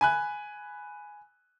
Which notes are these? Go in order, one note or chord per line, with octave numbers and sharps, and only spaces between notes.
G#5 B5 F#6